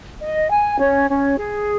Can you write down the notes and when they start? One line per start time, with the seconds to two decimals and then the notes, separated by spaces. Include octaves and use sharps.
0.20 D#5
0.50 G#5
0.79 C#4
1.09 C#4
1.37 G#4